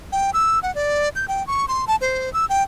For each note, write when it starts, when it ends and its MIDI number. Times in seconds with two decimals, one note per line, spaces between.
0.12 0.31 79
0.34 0.59 88
0.63 0.73 78
0.75 1.09 74
1.16 1.26 91
1.28 1.45 79
1.47 1.66 85
1.68 1.85 84
1.87 1.96 81
2.01 2.32 72
2.34 2.46 88
2.49 2.63 79